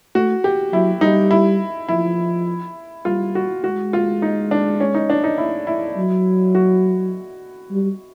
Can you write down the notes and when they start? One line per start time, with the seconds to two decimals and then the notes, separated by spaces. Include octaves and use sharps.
0.15 A3 F#4
0.44 G4
0.73 F#3 E4
1.01 G3 D#4
1.31 E4
1.89 F3 E4
3.05 G3 F4
3.35 F#4
3.64 G#3 F#4
3.93 F4
4.22 D#4
4.51 D4
4.80 C#4
4.95 D#4
5.10 D4
5.24 D#4
5.38 E4
5.67 E4
5.97 F#3
6.55 F#4
7.71 G3